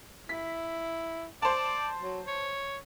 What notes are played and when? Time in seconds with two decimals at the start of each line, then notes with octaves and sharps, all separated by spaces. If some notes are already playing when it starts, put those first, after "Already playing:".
0.29 E4 B6
1.42 C5 D5 A5
1.99 F#3
2.27 C#5